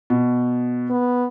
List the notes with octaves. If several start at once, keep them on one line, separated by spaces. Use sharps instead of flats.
B2
B3